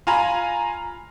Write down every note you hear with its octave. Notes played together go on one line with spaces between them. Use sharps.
F4 G#5 A#5 B5